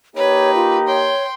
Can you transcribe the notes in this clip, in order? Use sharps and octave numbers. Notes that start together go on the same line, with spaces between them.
A#3 D#4 G4 B4 C#5
F4
C#5 G5 C6